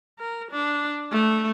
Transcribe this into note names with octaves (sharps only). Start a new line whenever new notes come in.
A#4
D4
A3